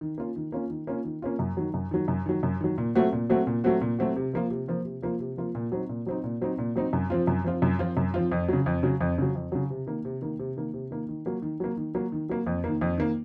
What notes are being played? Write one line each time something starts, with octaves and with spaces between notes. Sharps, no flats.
D#3
A#3 C#4 F4
D#3
A#3 C#4 F4
D#3
A#3 C#4 F4
D#3
A#3 C#4 F4
F#2
D#3 F#3
F#2
D#3 F#3
F#2
D#3 F#3
F#2
D#3 F#3
A#2
F#3 A3 C4 F#4
A#2
F#3 A3 C4 F#4
A#2
F#3 A3 C4 F#4
A#2
F#3 A3 C4 F#4
C3
F3 A#3 F4
C3
F3 A#3 F4
C3
F3 A#3 F4
C3
F3 A#3 F4
A#2
F#3 C4 D#4
A#2
F#3 C4 D#4
A#2
F#3 C4 D#4
A#2
F#3 C4 D#4
F#2
F3 C4 F4
F#2
F3 C4 F4
F#2
F3 C4 F4
F#2
F3 C4 F4
F2
C#3 F#3
F2
C#3 F#3
F2
C#3 F#3
F2
C#3 F#3
C3
D#3 A#3
C3
D#3 A#3
C3
D#3 A#3
C3
D#3 A#3
D#3
F#3 A#3
D#3
F#3 A#3
D#3
F#3 A#3
D#3
F#3 A#3
F2
D#3 A#3
F2
D#3 A#3